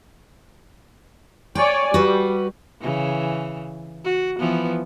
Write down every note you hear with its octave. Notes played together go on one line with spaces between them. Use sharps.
C#5 D5 G5 G#5
G3 F#4 B4
C#3 E3
F#4
E3 F3 B3